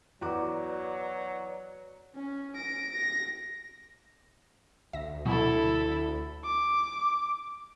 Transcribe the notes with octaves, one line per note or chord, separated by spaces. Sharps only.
E2 F#3 F#4 B4 D5 A#5 D6
C#4
A#6 D7
A#6
D2 E5 A#6
B2 F#3 E4 A4
D6